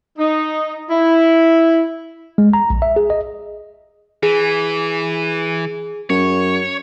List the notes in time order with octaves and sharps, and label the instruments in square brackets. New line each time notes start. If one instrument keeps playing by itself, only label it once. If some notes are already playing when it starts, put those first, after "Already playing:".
[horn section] D#4
E4
[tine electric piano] G#3
A#5
A#1
E5
G#4
D#5
[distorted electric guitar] E3 [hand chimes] G#4
[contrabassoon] F#2 [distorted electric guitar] C#5